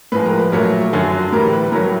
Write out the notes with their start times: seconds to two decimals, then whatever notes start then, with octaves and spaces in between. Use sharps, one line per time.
0.12 A2 F3 G#3 B4
0.26 A#4
0.39 B4
0.52 A#2 F#3 A3 A#4
0.93 F#2 D3 F#3
1.32 A2 E3 G3 A#4
1.53 B4
1.72 A2 F#3 A3 A#4